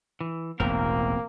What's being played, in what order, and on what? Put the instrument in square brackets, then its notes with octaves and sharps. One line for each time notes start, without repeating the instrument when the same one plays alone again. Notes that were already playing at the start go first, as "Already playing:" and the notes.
[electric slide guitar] E3
[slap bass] E1 A1 E2 [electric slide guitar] B2 C4 A#4 [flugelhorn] A#3